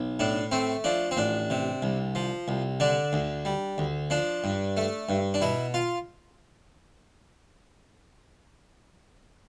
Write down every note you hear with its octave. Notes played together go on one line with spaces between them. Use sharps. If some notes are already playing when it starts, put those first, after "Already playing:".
Already playing: B1
A2 D4
A3 C4
F3 D4
C4
A1 D4
C3
C2
F3
C2
D3 D4
D2
G3
D2
F3 D4
G2
A3
G2
D4
B2 E4
F4